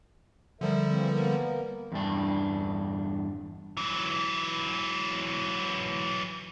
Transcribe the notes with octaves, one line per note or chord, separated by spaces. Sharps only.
D3 F3 G3 A#4 E5
E3 A#3 C4
A#3 B3 A#4
E2 G2 D4
E3 F#3